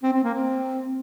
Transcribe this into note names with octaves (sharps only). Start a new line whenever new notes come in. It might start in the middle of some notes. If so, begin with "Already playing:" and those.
C4
C4
A#3
C4